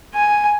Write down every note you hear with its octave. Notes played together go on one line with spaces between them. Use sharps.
G#5